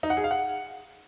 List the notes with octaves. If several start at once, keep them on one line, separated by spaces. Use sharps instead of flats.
D#4
F#5
G#4
F5
F#5